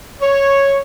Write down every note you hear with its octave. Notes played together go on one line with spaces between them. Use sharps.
C#5